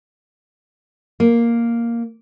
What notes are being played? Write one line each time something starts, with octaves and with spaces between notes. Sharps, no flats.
A#3